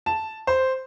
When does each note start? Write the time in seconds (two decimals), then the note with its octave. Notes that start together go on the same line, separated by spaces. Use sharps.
0.06 A5
0.47 C5